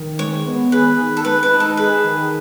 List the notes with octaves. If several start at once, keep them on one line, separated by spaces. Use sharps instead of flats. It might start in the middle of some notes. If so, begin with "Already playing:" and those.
Already playing: D#3
G#3 C#5
B3
G#4 B4
D#3
A4
G#3 B4
B4
D#4
A4
G#4 B4
D#3